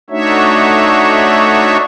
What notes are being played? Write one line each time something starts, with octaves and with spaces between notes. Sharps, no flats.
A3 D4 D#4 F#4 C#5 E5